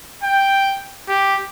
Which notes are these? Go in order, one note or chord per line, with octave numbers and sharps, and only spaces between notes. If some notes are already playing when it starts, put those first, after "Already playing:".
G5
G4